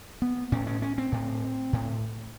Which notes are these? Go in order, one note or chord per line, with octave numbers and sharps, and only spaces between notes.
B3
A2 C#4
C#4
C#4
C4
A2
A2